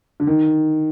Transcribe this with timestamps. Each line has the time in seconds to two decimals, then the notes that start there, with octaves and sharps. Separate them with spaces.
0.20 D3
0.27 D#3